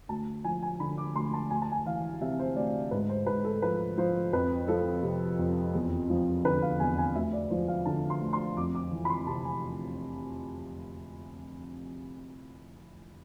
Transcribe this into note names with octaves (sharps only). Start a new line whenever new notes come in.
D2 A5
F3 G#5
G#5
D3 B5
D6
D2 C6
A5
D2 G#5
A5
G#5
E3 F5
C3 E5
C5
D2 D5
G#2 B4
C5
G#2 B4
A4
F3 B4
F3 C5
F2 B4
F3 A4
C3
F2
E2
F3
D3 B4
F5
E2 G#5
G#5
D2 E5
D5
F3 C5
F5
D3 A5
C6
D2
C6
F2 D6
D6
E3
B5
C6
C3 A5
G#5